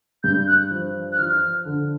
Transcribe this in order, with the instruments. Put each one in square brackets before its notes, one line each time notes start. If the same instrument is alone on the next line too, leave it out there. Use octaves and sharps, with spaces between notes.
[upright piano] G2 [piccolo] G6
[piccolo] F#6
[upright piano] F3
[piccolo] F#6
[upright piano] F3 [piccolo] F6
[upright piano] D3